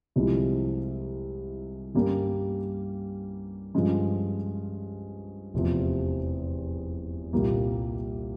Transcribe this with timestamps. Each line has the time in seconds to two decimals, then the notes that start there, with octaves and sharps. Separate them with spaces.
0.16 C2 C3 F3 G#3 E4
1.95 G2 G3 A#3 C#4 G4
3.75 G2 F3 G#3 C#4
5.54 F1 E2 C3 F3
7.33 C2 A#2 G3 A#3